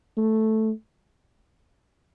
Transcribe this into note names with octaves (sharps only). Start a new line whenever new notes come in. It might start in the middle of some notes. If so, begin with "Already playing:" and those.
A3